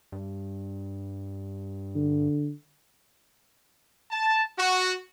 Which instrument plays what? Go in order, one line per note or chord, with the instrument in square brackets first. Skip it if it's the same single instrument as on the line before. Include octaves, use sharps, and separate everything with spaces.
[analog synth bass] G2
[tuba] D3
[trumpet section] A5
F#4